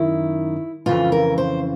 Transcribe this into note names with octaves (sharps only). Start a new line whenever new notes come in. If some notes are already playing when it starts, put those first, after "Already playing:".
Already playing: F#2 D#3 E4
F2 C#3 E3 F4
A#4
C5